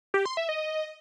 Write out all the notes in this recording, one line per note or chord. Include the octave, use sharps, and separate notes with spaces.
G4
C6
E5
D#5